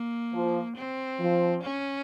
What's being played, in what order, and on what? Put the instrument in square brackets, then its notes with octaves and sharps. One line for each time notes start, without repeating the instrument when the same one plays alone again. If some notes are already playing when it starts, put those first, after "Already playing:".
Already playing: [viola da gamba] A#3
[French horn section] F3
[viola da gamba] C4
[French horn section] F3
[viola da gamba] C#4